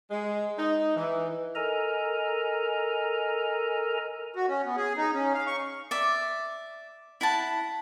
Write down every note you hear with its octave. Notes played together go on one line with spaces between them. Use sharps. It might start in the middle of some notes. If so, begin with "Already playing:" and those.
G#3
D#4
E3
A4 A#4 D#5 G#5 A#5
F#4
C#4
B3
G#4
D#4
C#4
F5
C#6
D5 E5
E4 F#5 A5